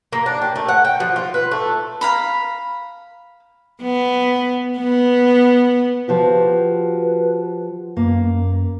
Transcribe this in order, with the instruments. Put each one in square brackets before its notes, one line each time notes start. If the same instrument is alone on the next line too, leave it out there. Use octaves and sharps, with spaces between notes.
[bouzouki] A#3
D4
G4
A3
F#5
G5
F3
F4
B4
A3
[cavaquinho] F5 A#5 B5
[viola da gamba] B3
B3
[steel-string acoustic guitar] F3 F#4 G4 [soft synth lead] B4
[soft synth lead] F#2 [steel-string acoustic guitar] A#3